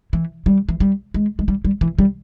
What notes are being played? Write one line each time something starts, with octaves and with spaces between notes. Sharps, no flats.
E3
G3
E3
G3
G#3
G#3
G3
G3
E3
G3